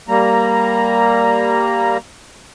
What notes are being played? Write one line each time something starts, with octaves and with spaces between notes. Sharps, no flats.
G3 A#3 A#5